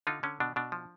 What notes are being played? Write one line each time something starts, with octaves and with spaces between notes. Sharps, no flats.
D3 D#4 F4
D3 C#4
B2 D4
B2 D4
F3